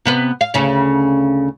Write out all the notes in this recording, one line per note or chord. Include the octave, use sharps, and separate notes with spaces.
C3 B3 B4
F5
D2 C#3 C#4